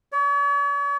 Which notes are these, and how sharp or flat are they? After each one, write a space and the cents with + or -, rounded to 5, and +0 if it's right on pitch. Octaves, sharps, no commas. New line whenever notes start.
C#5 +45